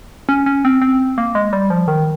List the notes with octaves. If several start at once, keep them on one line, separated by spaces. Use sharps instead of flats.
C#4
C#4
C4
C4
A#3
G#3
G3
F3
D#3